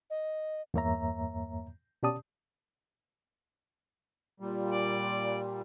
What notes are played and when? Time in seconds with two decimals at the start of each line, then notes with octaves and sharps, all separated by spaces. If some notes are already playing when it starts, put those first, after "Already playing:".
0.10 D#5
0.74 E2 G2 A#3 C#5 E5 A#5
2.03 B2 C#4 G4 D5 A5 D#6
4.40 A#2 G3
4.71 D5